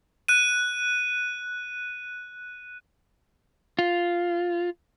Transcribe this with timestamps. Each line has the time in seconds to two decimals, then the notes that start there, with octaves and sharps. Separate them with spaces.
0.28 F#6 D#7
3.79 F4